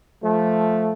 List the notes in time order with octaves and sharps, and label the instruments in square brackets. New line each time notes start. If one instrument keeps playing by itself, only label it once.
[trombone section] F3 A3